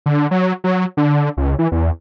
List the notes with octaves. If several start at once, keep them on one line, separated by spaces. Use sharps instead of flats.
D3
F#3
F#3
D3
C#2
E3
E2